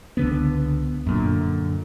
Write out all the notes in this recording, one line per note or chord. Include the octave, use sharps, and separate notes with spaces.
C#2 D3 B3
F#2 A#2 D3